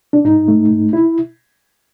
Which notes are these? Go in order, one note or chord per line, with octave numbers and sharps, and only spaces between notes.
D4
G#2 D#4
A3
G#2
E4